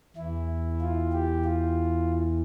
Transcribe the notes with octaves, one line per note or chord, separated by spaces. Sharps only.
E2 E3 E4
F4
G4
F4